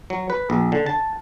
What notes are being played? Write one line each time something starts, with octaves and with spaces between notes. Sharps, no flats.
F#3
B4
A#1
D3
A5